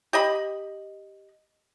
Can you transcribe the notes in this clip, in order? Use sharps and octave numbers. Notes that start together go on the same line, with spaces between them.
G4 D#5 B5